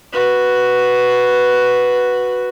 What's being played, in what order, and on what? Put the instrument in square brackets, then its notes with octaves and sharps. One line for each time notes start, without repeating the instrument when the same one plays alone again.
[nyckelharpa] F#4 B4